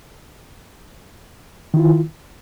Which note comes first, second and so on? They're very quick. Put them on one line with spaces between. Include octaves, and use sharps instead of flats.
D#3 E4 F4